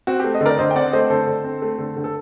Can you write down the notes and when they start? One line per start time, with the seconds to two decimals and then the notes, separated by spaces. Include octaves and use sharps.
0.07 C4 F#4
0.20 A3 G4
0.34 D#5
0.41 D3 A#4 D5
0.58 D3 C5 D#5
0.71 G5
0.76 C4 D5 F#5
0.93 A3 C5 D#5
1.10 D3 A4 C5
1.27 D3
1.44 C4
1.62 A3
1.78 D3
1.96 D3
2.04 A4